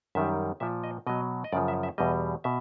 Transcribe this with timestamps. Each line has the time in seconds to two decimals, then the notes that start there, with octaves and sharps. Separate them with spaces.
0.15 F#2 D#3 G3 E5
0.60 A#2 F3 E5
0.84 D#5
1.07 B2 F#3 D#5
1.44 D#5
1.52 F#2 C#3 F3 D5
1.68 E5
1.83 E5
1.98 E2 B2 G3 D#5
2.44 B2 E5